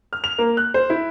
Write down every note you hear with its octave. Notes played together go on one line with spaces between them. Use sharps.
F6
F7
A#3
F#6
C5
E4